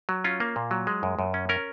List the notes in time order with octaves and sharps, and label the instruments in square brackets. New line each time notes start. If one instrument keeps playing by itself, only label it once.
[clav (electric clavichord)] F#3
C#4 F4
A#3
A#2
F#3
G#3
F#2
F#2
C#4
C#4 A#4